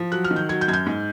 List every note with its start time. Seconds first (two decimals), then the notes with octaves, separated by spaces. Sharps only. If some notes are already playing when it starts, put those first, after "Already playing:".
Already playing: F3
0.12 F#3 F#6
0.24 F6
0.31 D#3
0.36 G6
0.49 F#3 G#6
0.61 G6
0.68 F#2 G#6
0.73 G6
0.86 G#2